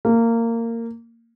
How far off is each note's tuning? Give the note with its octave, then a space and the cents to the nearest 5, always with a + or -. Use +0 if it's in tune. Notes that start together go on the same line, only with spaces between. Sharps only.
A#3 -20